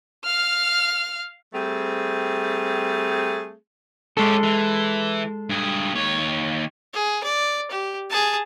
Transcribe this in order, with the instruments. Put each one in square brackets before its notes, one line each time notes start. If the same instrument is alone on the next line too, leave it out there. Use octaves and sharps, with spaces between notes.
[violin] F5 F6
[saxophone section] G3 A3 C4 G#4
[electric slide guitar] G#3 A4 [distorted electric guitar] C#4 G4
[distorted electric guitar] E3
G2 G#4
D#2 C#5
[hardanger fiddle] G#4
D5
G4
G#4 A5